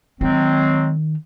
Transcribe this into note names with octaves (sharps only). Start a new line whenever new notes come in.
D#3 F#3 G#3 C4